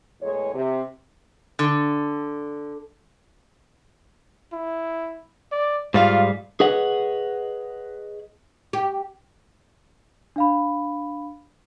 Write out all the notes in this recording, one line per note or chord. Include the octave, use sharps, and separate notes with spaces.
E2 A2 G#3 C#5
C3
D3
E4
D5
G#2 G3 F4 F5
G#4 B4 C#5 D#5 F#5
G4
D4 F5 B5